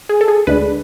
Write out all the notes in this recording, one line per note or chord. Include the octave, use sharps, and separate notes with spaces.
G#4
A4
G#4
D2 D3 G#3 D4 B4